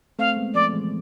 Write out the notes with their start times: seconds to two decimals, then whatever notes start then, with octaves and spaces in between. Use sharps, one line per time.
0.19 A3 C4 F5
0.36 G#3 B3
0.54 F3 A3 D5
0.73 E3 G#3